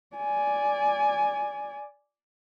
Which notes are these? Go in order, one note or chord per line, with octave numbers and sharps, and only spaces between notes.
D5 G#5